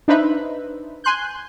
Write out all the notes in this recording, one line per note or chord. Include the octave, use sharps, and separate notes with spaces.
D4 D#4 B4 C5 E5
G#5 C6 F#6 G6